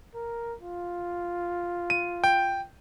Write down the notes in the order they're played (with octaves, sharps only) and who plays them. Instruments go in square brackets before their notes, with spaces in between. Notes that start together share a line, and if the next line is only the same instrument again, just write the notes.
[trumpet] A#4
F4
[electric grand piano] D#7
G5